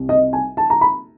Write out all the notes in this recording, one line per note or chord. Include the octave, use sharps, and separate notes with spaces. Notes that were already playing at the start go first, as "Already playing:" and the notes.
Already playing: C2
D#5
G#5
A5
A#5
B5